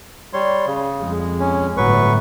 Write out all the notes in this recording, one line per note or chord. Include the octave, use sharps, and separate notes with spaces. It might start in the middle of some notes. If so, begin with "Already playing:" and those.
G3 C#5 C6
C#3
F2 G#3
C#4
G1 A2 F#3 B4 C#6